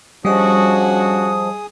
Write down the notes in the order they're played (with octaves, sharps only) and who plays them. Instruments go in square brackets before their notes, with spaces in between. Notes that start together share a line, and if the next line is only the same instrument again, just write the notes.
[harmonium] F3 [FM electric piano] G3 D#5 [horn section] C#4 D4 F#4 [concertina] G#4 D#6